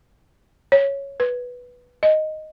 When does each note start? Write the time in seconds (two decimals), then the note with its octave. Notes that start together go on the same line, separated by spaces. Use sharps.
0.72 C#5
1.20 B4
2.03 D#5